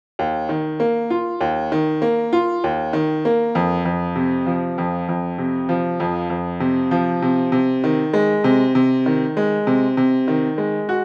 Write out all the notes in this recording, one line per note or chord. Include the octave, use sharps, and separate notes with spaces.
D#2
D#3
A#3
F4
D#2
D#3
A#3
F4
D#2
D#3
A#3
F2
F2
C3
F3
F2
F2
C3
F3
F2
F2
C3
F3
C3
C3
D#3
G#3
C3
C3
D#3
G#3
C3
C3
D#3
G#3
F#4